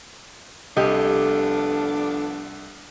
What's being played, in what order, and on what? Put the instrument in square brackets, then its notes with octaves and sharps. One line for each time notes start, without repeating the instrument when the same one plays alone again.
[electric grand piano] C2 [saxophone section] F3 B3 D4 [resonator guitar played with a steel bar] G4 D#5 [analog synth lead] A4